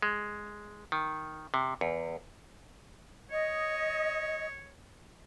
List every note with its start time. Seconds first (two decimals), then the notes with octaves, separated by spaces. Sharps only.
0.02 G#3
0.92 D#3
1.54 C3
1.81 E2
3.31 C#5 D#5